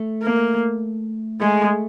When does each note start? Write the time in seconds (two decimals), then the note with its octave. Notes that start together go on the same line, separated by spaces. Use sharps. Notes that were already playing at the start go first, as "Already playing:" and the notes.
Already playing: A3
0.23 A#3
1.41 G#3 A3